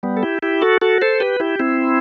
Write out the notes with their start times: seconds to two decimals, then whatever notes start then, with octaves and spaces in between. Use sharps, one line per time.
0.03 G3 B3
0.17 A4
0.23 E4 G4
0.43 E4 G4
0.62 F#4 A4
0.81 F#4 A4
1.02 A4 C5
1.20 G4 B4
1.40 E4 G4
1.59 C4 E4